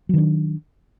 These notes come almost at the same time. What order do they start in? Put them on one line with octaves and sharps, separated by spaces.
F#3 D#3 D4